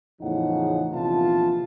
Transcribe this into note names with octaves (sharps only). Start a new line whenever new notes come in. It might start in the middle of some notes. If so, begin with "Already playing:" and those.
E2 A2 C#3 F3 D#4 F#5
A#1 C3 E3 B3 F4 A5